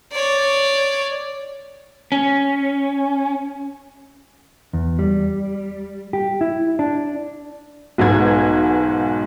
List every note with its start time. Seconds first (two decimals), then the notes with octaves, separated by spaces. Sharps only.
0.13 C#5 D5
2.12 C#4
4.73 E2
4.99 G3
6.13 G4
6.41 E4
6.79 D4
7.98 B1 G#2 F#4 B4 G#6